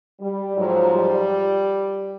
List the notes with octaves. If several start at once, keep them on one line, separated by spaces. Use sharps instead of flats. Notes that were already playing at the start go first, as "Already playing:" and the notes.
G3
G#2 F3 F#3
G3